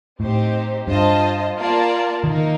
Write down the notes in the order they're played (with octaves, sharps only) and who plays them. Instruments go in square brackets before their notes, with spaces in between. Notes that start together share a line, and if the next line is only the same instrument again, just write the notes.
[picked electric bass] A2 [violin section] C4 D#4 G4 C5
[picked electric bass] G2 [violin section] F4 C5 D#5 A5
[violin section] A#3 F4 A#4 D5 A5
[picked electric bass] D#3 [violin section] A#3 D#4 A#4